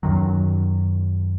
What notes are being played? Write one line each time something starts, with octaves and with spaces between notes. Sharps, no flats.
F#2 D#3 F#3